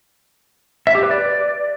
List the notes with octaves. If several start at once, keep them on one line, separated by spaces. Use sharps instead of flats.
E5
G4
B4
D5